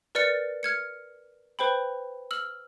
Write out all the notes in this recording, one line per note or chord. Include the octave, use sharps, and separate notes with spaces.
A#4 B4 D5 F6 A6 C#7
F6 G#6 C#7
B4 C5 G5 B5
E6 F6 F#7